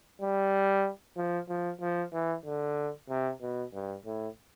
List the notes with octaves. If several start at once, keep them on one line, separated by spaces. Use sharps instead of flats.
G3
F3
F3
F3
E3
D3
C3
B2
G2
A2